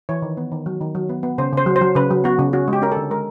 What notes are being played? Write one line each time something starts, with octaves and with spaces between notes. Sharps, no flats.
E3 C#5
D#3
B3
D#3
F#3
D#3
F#3
B3
B3
C#3 C5
C#3 C5
F#3
C5
F#3
C#3 B4
F#3
B3 F#4
C#3
C#4 F#4
G#3
G4
C#4 A#4
D3 A4
G#3 A#4